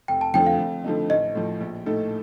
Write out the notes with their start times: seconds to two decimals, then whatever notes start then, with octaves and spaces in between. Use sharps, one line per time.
0.08 F1 G5
0.21 A5
0.34 F2 D3 F3 A3 G5
0.47 F5
0.58 F2
0.84 D3 F3 A3 D#4
1.10 A1 D#5
1.35 A2 F3
1.60 A#1
1.86 A2 A3 D#4 A4